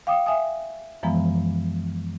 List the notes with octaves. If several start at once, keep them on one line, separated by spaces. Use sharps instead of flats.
F5 G5 D6 D#6
E5 G#5 D#6
F#2 E3 F3 G#3 B3 A#5